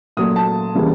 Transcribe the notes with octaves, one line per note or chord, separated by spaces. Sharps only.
A#2 F#3 A3 D#6
A5
C#3 E3 G3 A#3